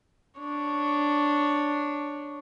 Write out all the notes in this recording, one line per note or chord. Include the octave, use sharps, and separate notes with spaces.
D4 C#5